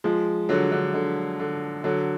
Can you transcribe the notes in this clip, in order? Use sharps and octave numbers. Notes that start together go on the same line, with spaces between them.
F3 G#3
D3 F#3
D3
D3
D3
D3 F#3